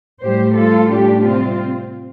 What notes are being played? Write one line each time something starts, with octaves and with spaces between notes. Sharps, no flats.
A2 G3 G4 C5
A2 G3 F4 A4
A2 G3 D4 G4
C3 G3 C4 F4